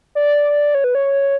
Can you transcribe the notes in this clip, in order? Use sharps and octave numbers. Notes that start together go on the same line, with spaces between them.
D5
C#5
B4
C#5